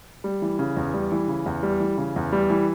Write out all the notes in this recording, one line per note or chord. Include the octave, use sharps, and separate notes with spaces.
G3
E3
C#3
E2
G3
E3
C#3
E2
G3
E3
C#3
E2
G3
E3